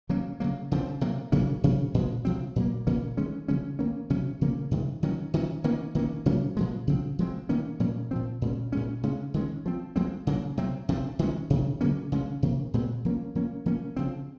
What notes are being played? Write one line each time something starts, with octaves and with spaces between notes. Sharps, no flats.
D#3 F#3 A#3 C#4
C#3 F#3 A#3
C#3 F3 C4
C3 F#3 A#3
C3 F#3 A#3 C#4
C3 F#3 C#4
A#2 F3 G#3
C3 F3 C4
A#2 F#3 A#3
A#2 F3 A#3 C#4
D#3 G#3 C#4
C#3 F3 G#3 C#4
D#3 A#3 C#4
C3 F#3 C#4
C#3 F3 A#3 C#4
C3 D#3 G#3
D#3 F#3 C#4
D#3 F#3 C#4
D#3 A#3 C#4
D#3 A#3 C#4
C3 F#3 A#3 C#4
A#2 F3 G#3
C#3 F3 C4
F3 G#3 C4
D#3 A#3 C#4
A#2 F3 A#3 C#4
A#2 F3 C4
A#2 G#3 C#4
A#2 G#3 C#4
C#3 G#3 C#4
D#3 G#3 C#4
F3 C4
F3 G#3 C4
C#3 F#3 A#3
C3 F#3 C4
C3 F3 C4
D#3 G#3 C#4
C3 D#3 F#3
C#3 F#3 A#3 C#4
C#3 G#3 C#4
C3 F3 A#3
A#2 G#3 C4
F3 A#3 C#4
F3 A#3 C#4
F3 A#3 C#4
C#3 F3 C4